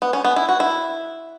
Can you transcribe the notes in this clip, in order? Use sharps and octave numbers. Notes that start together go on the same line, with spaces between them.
B3
C#4
B3
E4
F#4
E4